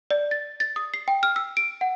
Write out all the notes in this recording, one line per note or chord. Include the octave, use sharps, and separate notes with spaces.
D5
A6
A6
D#6
C7
G5
F6
E6
D7
F#5